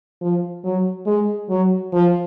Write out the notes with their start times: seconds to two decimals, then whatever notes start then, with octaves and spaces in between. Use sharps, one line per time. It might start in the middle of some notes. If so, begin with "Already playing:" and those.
0.21 F3
0.64 F#3
1.06 G#3
1.50 F#3
1.93 F3